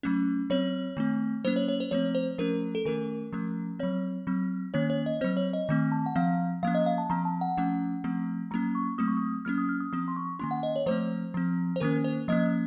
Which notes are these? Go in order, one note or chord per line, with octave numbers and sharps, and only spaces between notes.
F#3 A3 C#4
F#3 C4 C#5
D#3 A3 C4
F#3 A#3 C#4 C5
C#5
C#5
C5
F3 A3 C4 C#5
C5
F3 A3 C#4 A#4
A4
D#3 A3 C#4 A#4
F3 A3 C#4
F#3 C4 C#5
F#3 C4
D#3 A#3 C#4 C#5
C#5
D#5
F#3 C4 C5
C#5
D#5
D#3 A3 C4
A5
F#5
F3 C4 F5
F3 A#3 C#4 F5
D#5
F5
A5
F3 C4 A#5
A5
F#5
F3 A3 C#4
F3 A3 C4
F#3 A#3 C#4 A#5
C#6
F#3 A3 C4 D#6
C#6
D#6
F#3 A#3 C#4 F6
D#6
F6
D#6
F3 C4 D#6
C6
C#6
D#3 A#3 C#4 C6
F#5
D#5
C#5
F3 A3 C4 C5
F3 C4
C5
D#3 A#3 C#4 A#4
C5
F3 A#3 C#4 D#5